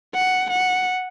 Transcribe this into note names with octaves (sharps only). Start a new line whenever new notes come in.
F#5
F#5